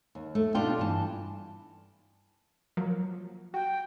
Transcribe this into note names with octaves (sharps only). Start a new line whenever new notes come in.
D#2
A3
B2 D4 D#4 F4 G4 G5
G2 E3 A5
F3 F#3 A#3
F#4 G5